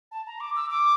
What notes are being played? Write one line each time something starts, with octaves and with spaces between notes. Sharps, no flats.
A5
A#5
D6
E6
D6